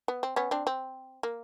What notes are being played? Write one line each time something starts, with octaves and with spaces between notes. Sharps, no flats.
B3
C4
B3 C#4
C4 D4
C4
A#3